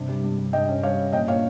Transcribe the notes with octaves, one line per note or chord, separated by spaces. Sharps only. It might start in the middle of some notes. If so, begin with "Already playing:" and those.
Already playing: G2 C3
G3
G2
G3
G2 D#5 G5
C#4
G3 C#5 F5
C#4
A#2 D#5 G5
A#2 C#5 F5